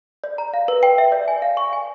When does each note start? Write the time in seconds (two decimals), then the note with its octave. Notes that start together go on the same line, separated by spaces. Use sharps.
0.24 D5
0.38 A#5
0.54 F5
0.68 B4
0.83 G5
0.98 E5
1.12 D5
1.28 G#5
1.42 F5
1.57 C#6
1.73 G#5